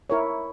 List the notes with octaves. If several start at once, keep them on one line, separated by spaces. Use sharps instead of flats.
E4 A#4 C#5